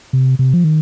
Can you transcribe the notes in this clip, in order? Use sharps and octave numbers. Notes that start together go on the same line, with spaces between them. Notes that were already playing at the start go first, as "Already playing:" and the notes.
C3
C3
F3
D#3